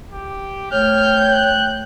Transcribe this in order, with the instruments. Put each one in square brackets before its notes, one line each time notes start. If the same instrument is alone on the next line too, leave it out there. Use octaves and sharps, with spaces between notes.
[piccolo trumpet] G4
[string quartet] A3 G6 [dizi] C#5 [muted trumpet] G5 [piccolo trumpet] F6
[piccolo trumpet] F#6